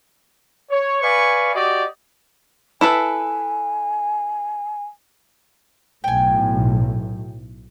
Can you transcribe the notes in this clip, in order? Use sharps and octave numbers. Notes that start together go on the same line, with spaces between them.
C#5
B4 D5 F5 G#5 C#6
F#4 G4 D5 D#5
E4 A4 B4 G#5
B1 A2 G5 G#5